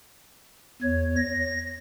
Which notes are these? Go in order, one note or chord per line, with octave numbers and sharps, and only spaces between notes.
E2 C#5
A#6